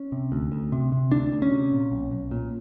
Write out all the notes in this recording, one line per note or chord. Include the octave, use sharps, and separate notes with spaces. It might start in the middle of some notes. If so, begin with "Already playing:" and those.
Already playing: C#4
C3
D2
D2
C3
C3
D2 D4
D2
C#4
C3
A#2
B1
B1
A#2